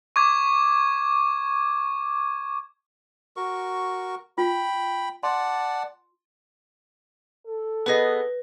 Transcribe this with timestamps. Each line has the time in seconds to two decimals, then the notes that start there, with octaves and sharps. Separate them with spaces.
0.16 C#6 D6 G#6
3.37 F#4 A#4 C#6
4.38 F4 G5 B5
5.23 D5 F#5 A5 C6
7.46 A4
7.86 B3 G#4 B4 D#5 A#6